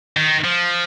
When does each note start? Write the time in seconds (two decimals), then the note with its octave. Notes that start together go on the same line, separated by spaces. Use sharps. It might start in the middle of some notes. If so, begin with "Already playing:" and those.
0.17 D#3
0.44 F3